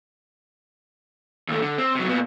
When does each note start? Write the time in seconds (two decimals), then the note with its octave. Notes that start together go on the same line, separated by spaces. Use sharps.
1.48 D#2 A3
1.62 D3
1.78 C4
1.95 C3 F#3
2.07 A#2 B3